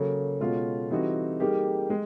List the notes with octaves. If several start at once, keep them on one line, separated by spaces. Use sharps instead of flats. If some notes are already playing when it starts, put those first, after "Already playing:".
Already playing: C#3 F#3 A#3 A4
B2 G#3 C#4 F4
E3 G3 C4 D#4 F#4
G3 A#3 D#4 G4 G#4
G#3